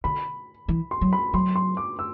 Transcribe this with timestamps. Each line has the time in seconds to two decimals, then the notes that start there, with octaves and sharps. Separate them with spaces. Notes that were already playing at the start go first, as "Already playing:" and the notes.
0.04 D3 B5
0.68 E3
0.91 C6
1.01 F#3
1.13 B5
1.34 F#3 C6
1.56 C6
1.77 D6
1.99 E6